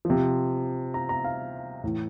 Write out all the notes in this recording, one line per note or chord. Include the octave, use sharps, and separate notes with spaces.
C3 F3
A#5
A#5
F5
A2 E3